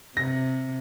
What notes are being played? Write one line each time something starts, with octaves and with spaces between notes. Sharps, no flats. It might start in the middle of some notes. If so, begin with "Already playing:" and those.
C3 A#6